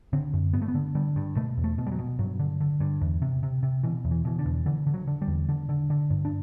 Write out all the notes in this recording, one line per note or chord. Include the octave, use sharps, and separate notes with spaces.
D3 C4
F#2
G2 B3
A3
B3
D3
D3 G3
G2
B2 A3
E2
A3
B2
G3
F#3
B2
G2 F#3
D3
D3
G2
E2
C3
C3
C3
B2 E3
E2
E3
B2 E3
D3
E2
D3 E3
D3
F#3
D3
G3
E2
D3
D3
D3
G2
D4